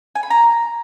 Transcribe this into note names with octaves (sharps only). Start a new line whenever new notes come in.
G#5
B5
A#5